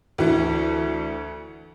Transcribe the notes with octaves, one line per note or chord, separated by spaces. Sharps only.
D2 E3